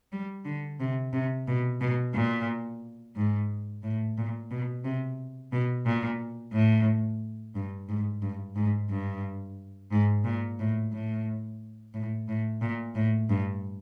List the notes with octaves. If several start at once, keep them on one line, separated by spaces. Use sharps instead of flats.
G3
D3
C3
C3
B2
B2
A#2
G#2
A2
A#2
B2
C3
B2
A#2
A2
G2
G#2
G2
G#2
G2
G#2
A#2
A2
A2
A2
A2
A#2
A2
G2